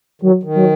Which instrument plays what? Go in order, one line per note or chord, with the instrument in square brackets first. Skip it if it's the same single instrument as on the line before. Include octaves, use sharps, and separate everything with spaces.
[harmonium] D#3 [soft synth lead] F#3
[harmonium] D#3
[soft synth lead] F#3